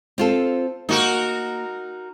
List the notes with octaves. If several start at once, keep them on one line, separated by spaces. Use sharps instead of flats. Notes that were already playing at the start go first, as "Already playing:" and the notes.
C4 F4 A4
A#3 D#4 F#4 A#4